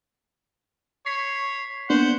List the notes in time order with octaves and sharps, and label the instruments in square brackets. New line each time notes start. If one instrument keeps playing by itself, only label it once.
[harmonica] C#5 [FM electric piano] B6 C7
[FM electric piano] A#3 B3 D4 [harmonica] C5 F#5